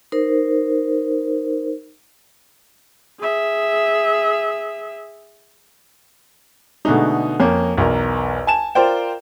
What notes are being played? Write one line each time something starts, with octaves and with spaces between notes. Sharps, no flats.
D#4 A#4 C5
G#4 E5
B2 D3 G#3 A3 D#4
F2 A#3 C#4
B1 E2 A#4
G#5 A5 E7
F4 A#4 C5 D5 G5